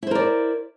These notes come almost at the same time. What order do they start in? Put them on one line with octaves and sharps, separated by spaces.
E4 C5 A#4 D5